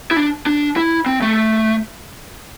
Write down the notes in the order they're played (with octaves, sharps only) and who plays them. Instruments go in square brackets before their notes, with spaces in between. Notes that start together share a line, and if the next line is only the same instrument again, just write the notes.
[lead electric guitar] E4
D4
D4
E4
C4
A3